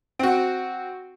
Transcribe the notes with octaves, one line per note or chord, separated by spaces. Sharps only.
C4 F#4